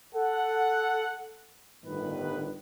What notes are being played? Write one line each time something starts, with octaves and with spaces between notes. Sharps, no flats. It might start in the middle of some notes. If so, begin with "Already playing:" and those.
A4 F#5
G1 A2 D#3 B4